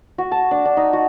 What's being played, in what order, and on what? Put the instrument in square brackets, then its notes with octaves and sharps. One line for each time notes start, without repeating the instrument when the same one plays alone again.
[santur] F#4
A5
D4
D4
D#4
F#4